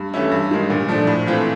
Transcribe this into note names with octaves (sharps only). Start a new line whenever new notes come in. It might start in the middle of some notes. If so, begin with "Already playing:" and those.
Already playing: G2
E3 A3 C#4 E4
G2
D#3 G#3
A#2
F3 A3 D4
A2
E3 A3 C4 F4